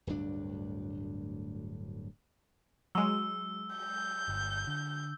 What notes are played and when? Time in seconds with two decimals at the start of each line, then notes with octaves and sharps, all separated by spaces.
0.07 D1 D2 G2 D4
2.95 F#3 G#3 E6
3.76 G6
4.28 G1
4.67 D3